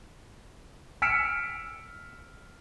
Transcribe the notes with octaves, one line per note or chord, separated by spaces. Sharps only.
E6 F6 B6 C#7 D7 E7